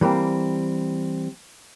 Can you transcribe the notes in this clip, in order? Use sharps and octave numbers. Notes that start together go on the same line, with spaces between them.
E3 G3 A#3 C4